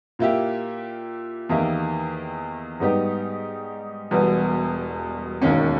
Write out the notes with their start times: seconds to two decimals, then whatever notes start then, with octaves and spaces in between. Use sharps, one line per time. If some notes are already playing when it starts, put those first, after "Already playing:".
0.19 A#2 A#3 E4 G4
1.49 E2 D#3 A#3 E4 G4
2.80 G#2 G3 B3 D#4 G4
4.11 E1 E2 B2 G3 B3
5.42 E1 D#2 D#3 A#3 C#4